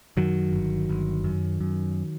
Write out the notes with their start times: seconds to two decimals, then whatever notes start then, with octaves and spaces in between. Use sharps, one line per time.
0.17 F#2 D#3 F#3
0.53 G1
0.89 G1
1.24 F#2
1.60 F#2